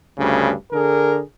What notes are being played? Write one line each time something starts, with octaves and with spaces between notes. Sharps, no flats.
D2 G2 C#3
D3 G#4 A#4